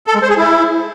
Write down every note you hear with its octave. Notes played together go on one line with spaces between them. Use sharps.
A4
G#3
C5
G#4
E4